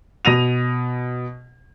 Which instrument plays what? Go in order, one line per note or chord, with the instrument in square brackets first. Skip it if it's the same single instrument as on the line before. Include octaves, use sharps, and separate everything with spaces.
[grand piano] B2 A#6 D#7 F7